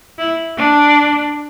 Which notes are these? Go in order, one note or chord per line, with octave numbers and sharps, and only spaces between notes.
E4
D4